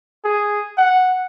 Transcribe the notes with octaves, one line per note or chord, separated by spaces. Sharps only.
G#4
F#5